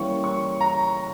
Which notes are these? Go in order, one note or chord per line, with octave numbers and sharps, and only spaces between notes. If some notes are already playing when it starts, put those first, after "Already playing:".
Already playing: E3 G3 A#3 C#4 C#6
C#6
A#5